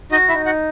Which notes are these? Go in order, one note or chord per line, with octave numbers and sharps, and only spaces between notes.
D#4 F#4 D#5
E4 E5
D#4
F#4 F#5